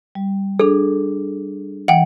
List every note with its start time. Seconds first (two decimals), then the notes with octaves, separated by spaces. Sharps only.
0.15 G3
0.60 D4 G#4 A4
1.88 E3 F#5 G5